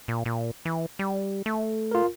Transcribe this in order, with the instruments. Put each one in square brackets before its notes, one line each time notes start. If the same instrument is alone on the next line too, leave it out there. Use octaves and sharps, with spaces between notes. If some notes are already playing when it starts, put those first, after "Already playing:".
[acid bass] A#2
A#2
E3
G3
A3
[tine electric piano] F4 A#4